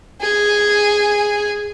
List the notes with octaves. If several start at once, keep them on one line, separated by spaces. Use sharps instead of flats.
G#4 G#5